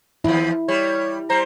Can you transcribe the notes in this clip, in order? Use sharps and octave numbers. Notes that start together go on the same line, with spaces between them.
D#2 F3 E4
G3 C#5
G3 C5 A#5